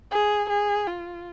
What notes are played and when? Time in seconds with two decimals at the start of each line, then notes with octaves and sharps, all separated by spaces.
0.11 G#4
0.50 G#4
0.88 F4